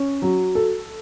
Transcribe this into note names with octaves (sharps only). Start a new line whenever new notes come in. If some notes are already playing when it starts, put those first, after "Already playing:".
Already playing: C#4
F#3
A4